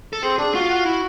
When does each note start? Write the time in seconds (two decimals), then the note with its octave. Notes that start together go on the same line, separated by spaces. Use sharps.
0.13 A4
0.23 C4 G#4
0.38 D4 G#4
0.55 F4 F#4
0.70 F#4
0.85 E4